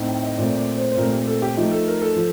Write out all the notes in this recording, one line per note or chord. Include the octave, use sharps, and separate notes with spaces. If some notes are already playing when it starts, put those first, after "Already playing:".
Already playing: A2 A3 C4 D#4
G5
D#5
A#2 A3 C4 D5
D5
C5
C5
A#2 A3 C4 A#4
G4
A4
G4
F3 A3 D#4 G4
A4
A#4
A4
F3